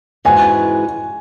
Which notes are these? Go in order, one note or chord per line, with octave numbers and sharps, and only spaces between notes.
G#2 E3 G#3 C#4 F#4 G#5